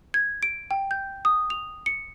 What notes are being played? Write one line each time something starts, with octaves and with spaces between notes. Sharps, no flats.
G#6
D7
G5
G6
D#6
F7
C#7